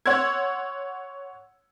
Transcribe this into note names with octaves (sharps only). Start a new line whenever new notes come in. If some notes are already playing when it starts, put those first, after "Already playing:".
C#5 F#5 C6 E6 G#6